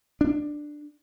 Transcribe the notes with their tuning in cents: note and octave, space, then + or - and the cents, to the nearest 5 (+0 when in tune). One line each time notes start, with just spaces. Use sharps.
D4 +10